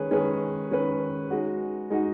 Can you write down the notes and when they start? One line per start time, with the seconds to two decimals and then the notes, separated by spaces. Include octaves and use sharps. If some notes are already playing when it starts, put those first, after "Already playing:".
Already playing: D#3 G#3 C#4 G#4 B4
0.11 D#3 G#3 C#4 G#4 B4
0.71 D#3 G#3 C#4 G#4 B4
1.30 G#3 D#4 F#4
1.90 G#3 D#4 F#4